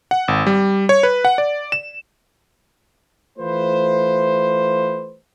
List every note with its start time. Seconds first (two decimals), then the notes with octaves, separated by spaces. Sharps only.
0.11 F#5
0.28 G#1
0.46 G3
0.89 C#5
1.03 B4
1.25 F#5
1.38 D5
1.72 E7
3.39 E3 A3 F4 B4 C5